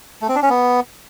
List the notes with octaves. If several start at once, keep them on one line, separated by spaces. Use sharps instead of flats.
A3
C4
D4
C#4
B3